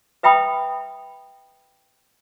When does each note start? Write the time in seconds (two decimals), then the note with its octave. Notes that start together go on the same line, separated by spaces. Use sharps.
0.23 B4 E5 G5 B5 D#6